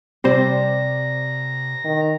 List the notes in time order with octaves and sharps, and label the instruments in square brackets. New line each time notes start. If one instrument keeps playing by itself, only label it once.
[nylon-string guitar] C3 D5 [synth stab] G3 C4 C5 [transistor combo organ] A#5
[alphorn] D#3